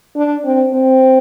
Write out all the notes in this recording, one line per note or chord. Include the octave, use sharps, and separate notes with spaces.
D4
C4
C4